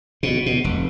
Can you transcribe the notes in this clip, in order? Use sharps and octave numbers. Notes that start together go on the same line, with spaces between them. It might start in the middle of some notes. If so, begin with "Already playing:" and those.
B2
B2
F1